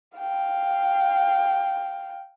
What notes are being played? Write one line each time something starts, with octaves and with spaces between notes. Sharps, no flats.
F5 G5